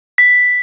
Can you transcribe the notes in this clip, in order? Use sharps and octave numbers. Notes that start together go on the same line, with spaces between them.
B6